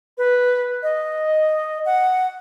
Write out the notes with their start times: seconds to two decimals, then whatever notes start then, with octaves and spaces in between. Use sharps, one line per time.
0.18 B4
0.83 D#5
1.86 F#5